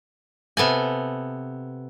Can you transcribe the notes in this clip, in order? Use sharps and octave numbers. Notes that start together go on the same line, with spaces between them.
C3 B3 A4 G#5